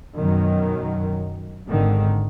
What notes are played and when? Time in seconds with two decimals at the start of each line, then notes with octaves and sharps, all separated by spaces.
0.16 F#2 B2 D#3 F#3
1.67 G#1 G#2 D3 D#3